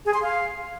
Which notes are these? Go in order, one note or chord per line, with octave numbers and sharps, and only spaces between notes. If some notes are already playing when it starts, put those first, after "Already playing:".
G#4
C6
F5